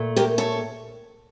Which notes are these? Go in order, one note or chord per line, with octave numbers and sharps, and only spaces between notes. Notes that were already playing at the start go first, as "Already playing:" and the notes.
Already playing: A#2 A3
G4 A#4
A4 C#5